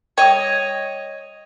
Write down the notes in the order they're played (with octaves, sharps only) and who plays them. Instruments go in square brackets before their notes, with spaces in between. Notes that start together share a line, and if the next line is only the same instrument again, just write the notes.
[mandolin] C#5 D#5 [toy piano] G5 D#6